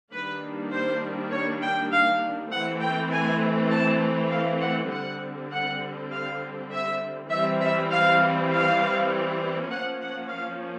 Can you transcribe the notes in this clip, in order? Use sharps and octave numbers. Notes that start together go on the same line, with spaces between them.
D#3 G3 A#3 D4 B4
C5
C#5
G5
F5
E3 A3 C4 F#5
G5
G#5
A5
F5
F#5
D3 G3 C4 F#5
F#5
F5
E5
E3 G3 C4 E5
E5
F5
F5
F3 A#3 C#4 F#5
F#5
F5